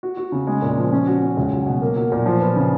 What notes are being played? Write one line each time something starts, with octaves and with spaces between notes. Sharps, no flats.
F#4
F#4
C#3
G#3
A#2
F3
C#4
F#4
C#4
C#2
F#3
B2
A#3
F#3
A#2
F3
B3
C#3